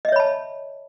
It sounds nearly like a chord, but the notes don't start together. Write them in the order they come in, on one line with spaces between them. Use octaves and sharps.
D#5 E5 C#5 B5 A5